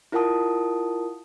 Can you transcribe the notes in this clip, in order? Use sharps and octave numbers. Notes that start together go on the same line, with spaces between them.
E4 F4 A#4 F#5 A5 D#6